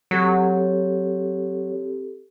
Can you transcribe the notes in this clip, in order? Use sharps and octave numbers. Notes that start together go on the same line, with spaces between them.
F#3 C4 G4 A4